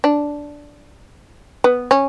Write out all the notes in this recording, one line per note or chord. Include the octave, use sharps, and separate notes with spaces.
D4
B3
C#4